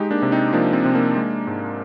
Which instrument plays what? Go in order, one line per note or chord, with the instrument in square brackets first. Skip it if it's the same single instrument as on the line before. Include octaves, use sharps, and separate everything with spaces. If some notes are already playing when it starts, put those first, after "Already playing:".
Already playing: [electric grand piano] G#3 D#4 G4
A#3 D4
C3
C4 D#4
F3 A#3 D4
C4
C3
A#3 D4
G#3
G#2